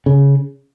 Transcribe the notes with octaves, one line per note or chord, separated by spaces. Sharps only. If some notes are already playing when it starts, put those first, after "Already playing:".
C#3